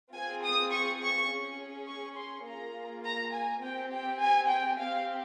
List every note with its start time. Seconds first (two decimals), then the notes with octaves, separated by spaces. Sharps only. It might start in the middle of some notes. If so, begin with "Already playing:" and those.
0.14 C4 F4 G#4 G#5
0.43 D#6
0.71 C#6
1.01 C#6
1.30 C#4 G#4
1.88 C#6
2.17 C6
2.46 A#3 F4 G#4 A#5
3.05 A#5
3.33 G#5
3.62 C4 G4 G5
3.92 G5
4.20 G#5
4.49 G5
4.78 C4 G4 F5